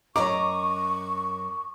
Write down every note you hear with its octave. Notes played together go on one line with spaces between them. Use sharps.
F#2 D#5 A#5 C#6 D6